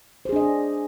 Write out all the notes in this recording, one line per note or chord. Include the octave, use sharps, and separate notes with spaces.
D4 G#4 C5 D#5